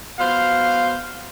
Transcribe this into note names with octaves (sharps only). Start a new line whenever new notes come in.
B3 F#4 C5 F5